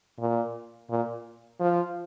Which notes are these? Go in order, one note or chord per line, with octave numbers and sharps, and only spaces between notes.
A#2
A#2
F3